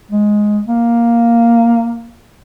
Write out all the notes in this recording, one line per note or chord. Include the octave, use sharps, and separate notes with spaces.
G#3
A#3